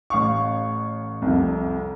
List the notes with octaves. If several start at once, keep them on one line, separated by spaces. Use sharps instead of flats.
A1 F5 C#6
C2 F2